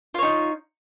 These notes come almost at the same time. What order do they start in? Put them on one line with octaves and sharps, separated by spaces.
F4 C#5 D#4